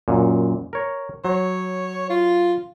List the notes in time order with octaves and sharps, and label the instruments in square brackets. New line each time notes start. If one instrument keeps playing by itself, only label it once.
[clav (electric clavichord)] F#2 A#2
A#4 C#5
[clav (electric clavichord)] F#3 [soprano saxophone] C#5
[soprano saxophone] F4